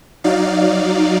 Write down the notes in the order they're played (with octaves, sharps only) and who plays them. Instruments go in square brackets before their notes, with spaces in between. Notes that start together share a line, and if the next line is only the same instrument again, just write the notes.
[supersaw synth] F#3 D#4 D5 F5